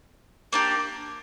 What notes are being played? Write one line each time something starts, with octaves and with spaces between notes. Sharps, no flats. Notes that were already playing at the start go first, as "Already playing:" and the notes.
A#3 D4 G4